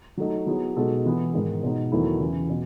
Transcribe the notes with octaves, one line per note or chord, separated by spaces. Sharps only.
F#3 A3 D#4
F#3 B3 E4 G#4
B2 G#3 D#4 F#4 A4
E3 B3 E4
G#2 D#3 G#3
B2 G#3 D#4
E2 D#3 F#3 A3 E4
E2 C#3 E3
B2